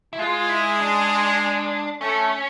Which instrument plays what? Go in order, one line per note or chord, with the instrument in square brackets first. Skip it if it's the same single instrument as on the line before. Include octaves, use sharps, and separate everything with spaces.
[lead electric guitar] E4
[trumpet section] G#3 [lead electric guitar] F4
[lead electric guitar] E4
D4
[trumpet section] A3 [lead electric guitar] C#4